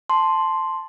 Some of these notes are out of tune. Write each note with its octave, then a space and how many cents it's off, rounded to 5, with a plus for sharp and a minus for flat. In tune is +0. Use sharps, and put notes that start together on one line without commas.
A5 +0 C6 +0